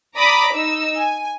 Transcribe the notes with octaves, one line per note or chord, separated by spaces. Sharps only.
D5 A#5 B5 D6 D#6 B6
D#4 E6
G#5